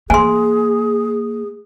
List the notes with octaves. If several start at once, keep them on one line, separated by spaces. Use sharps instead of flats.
A#3 G#4 G#5 C6